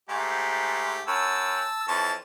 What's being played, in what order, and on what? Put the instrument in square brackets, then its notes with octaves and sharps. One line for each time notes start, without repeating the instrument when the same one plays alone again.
[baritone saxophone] G#2 [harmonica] A3 G4
[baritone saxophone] F#2 [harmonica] A5 E6
[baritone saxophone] F2 [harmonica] E3 C#5 A5